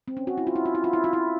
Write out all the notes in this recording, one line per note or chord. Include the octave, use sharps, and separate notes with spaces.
C4
C#4
F#4
E4
F4
E4
F4
E4
F4
E4
F4
E4